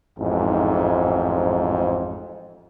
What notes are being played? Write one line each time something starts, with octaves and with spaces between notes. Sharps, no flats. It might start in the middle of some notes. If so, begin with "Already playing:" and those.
A1 F2 G#2